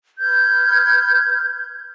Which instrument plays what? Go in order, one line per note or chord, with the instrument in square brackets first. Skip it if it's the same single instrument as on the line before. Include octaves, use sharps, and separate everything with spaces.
[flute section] B4 F6 G6 G#6